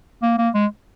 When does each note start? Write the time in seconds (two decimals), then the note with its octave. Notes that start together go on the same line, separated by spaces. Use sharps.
0.22 A#3
0.38 A#3
0.54 G#3